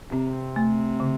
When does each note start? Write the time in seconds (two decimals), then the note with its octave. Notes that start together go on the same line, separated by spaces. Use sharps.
0.12 C3 C4
0.56 A3
1.00 C#3